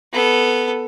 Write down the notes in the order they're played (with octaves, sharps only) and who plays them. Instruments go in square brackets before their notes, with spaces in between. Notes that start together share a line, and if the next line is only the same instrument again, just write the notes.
[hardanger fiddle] B3 A4